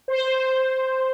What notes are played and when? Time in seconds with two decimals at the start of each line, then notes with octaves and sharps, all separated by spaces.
0.08 C5